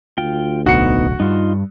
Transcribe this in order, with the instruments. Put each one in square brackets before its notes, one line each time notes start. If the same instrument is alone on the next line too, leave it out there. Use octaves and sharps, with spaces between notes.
[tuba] D2 [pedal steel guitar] F4 G5
[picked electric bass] D1 B1 [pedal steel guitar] B3 D#4 [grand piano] F#4 C#7
[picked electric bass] G2 G3 [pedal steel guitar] D#4 F4